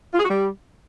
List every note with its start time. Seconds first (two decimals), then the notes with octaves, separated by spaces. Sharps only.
0.14 F4
0.19 G#4
0.25 F#4
0.30 G3